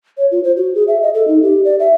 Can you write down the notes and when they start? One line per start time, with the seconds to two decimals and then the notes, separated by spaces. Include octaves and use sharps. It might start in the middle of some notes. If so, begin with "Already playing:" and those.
0.17 C#5
0.31 F4
0.44 C5
0.57 F#4
0.75 G#4
0.88 E5
1.02 D#5
1.14 A4
1.28 D#4
1.42 G4
1.65 D5
1.80 E5